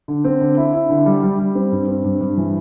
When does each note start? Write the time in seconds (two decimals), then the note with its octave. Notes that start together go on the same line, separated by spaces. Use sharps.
0.08 D3
0.24 C4
0.41 D3
0.57 E4
0.73 E4
0.90 D3
1.06 G3
1.23 G3
1.39 G3
1.55 C4
1.72 G2
1.88 C4
2.04 G2
2.21 G2
2.37 E3